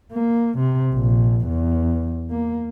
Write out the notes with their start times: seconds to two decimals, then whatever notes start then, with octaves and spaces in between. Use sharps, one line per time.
0.12 A#3
0.58 C3
0.94 A#1
1.47 E2
2.30 A#3